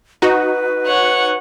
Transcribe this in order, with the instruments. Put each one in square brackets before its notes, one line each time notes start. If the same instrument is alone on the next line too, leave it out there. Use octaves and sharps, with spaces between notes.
[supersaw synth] D#4 F#4 [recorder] B4
[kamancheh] C#5 [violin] F#5